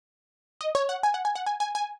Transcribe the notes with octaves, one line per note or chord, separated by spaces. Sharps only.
D#5
C#5
F#5
G#5
F#5
G#5
F#5
G#5
G#5
G#5